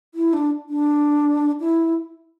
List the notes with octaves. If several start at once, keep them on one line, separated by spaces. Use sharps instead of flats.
E4
D4
D4
E4